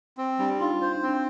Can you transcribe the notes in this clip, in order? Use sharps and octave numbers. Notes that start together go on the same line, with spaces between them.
C4
G3 D4
D#4 F4
D4 C5
D#4
C4
D4